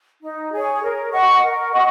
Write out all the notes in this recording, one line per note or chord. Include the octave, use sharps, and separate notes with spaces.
D#4
G#4 C#5
A#4
D#5 F#5 C#6
A#4
D#5 F#5 C#6